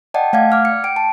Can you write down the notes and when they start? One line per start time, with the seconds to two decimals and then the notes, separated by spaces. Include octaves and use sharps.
0.14 D5 D#5 F#5 G5 A5
0.33 A3 D5 F5 F#5 G#6
0.50 D6 F6 G#6
0.65 C#7
0.84 G5 D7
0.96 A5